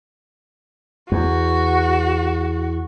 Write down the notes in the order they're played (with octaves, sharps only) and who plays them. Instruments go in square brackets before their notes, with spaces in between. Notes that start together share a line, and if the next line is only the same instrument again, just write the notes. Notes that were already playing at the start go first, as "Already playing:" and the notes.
[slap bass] E2 [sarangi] F#4